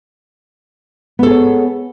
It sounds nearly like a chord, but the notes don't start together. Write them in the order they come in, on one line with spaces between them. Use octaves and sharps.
B3 A4 G#4 C#5